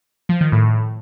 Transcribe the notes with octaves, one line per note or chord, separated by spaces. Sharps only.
F3
D#3
A2